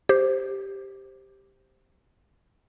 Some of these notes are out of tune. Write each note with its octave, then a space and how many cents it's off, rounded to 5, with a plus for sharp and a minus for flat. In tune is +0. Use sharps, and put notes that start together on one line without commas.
G4 +0 C5 +0